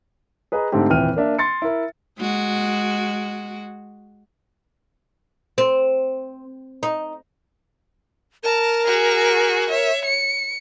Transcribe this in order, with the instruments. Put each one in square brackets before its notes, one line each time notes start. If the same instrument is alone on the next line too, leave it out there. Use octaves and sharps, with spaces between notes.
[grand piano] G#4 B4 D#5 A#5
G#2 D3 A3 C4 G4
D#1 F2 E3 G5 F6 D#7
A#3 D4 E5
C6 A6 C#7
E4 A#4
[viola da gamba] G#3 F#4
[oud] C4
D#4
[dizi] A#4 [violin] A5
[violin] F#4 G#4
C#5 E5
C#7